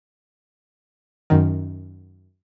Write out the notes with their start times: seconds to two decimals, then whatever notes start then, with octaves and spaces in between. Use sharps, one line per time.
1.30 F#2 D#3